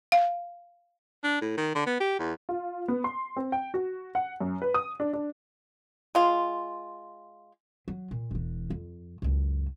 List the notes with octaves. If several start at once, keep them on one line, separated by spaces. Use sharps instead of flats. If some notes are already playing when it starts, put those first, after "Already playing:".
F5
D4
A2
D#3
D3
B3
G4
E2
F4
B3
C6
C4
G5
F#4
F#5
F#2
B4
D#6
D4
D4
G#3 F4
F#3
A#2
E1 E3
F2
C#2 F#2